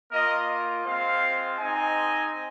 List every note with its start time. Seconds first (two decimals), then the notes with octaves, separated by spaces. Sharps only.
0.11 A#3 F4 A#4 D#5
0.85 G#3 C4 F4 C5 F5
1.59 G#3 C4 D#4 D#5 G#5